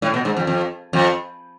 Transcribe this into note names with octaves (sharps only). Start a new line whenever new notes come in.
A2
B2
G#2
F2
F2
F2